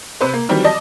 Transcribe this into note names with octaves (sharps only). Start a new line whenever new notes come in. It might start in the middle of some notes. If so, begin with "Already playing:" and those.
C3 B4 C5
A#3
D#3 E3 F#3 G3 C4
D5 D#5 A5